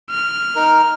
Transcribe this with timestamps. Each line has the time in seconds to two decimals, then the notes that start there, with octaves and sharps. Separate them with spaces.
0.11 F6
0.55 D#4 A#4